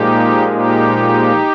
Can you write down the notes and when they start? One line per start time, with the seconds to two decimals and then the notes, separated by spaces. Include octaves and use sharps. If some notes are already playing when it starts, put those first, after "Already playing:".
Already playing: A#2 F3 G#3 D#4 G4
0.48 D#4 G4